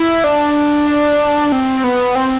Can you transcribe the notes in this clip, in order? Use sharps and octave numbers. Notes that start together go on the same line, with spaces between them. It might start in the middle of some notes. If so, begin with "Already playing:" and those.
Already playing: E4
D4
C4
B3
C4